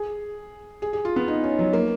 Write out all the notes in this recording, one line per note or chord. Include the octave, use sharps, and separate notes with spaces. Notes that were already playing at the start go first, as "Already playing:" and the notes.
Already playing: G#4
G#4
G#4
F4
B3
D#4
C#4
F#3
A#3